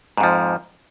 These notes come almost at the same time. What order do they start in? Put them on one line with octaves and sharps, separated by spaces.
G#2 F2 F3